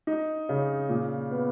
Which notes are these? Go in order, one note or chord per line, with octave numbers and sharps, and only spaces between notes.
D#4
C#3
A#2
B3